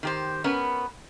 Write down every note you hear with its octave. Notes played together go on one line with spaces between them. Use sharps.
D#3 G4 C5
B3 C#4 A#4 B4